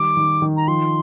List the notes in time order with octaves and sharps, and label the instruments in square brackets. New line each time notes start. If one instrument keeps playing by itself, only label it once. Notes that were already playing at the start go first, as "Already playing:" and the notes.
Already playing: [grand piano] D#3 G3 [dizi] D6
[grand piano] D#3
D#3
[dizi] A#5
[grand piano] F3 [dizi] C6